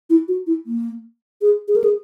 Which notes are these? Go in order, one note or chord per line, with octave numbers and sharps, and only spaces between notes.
E4
F#4
E4
A#3
G#4
G#4
A#4
G#4